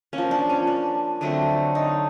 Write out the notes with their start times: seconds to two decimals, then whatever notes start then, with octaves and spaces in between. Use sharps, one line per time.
0.13 A#3 C#4
0.18 F3
0.31 D4
0.50 C#4
0.67 D4
1.21 D3 F#3 A3 C4
1.75 D#4